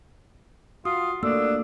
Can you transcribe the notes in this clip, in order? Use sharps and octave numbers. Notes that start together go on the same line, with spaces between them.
F4 F#4 D#6
A3 A#3 D4 E6